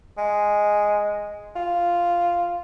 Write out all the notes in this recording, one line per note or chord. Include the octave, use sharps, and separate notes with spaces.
G#3
F4